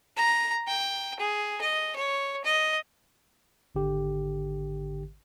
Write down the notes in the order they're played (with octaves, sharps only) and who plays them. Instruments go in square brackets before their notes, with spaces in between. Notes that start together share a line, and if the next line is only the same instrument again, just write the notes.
[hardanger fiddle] A#5
G5
G#4
D#5
C#5
D#5
[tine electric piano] G#1 D3 G4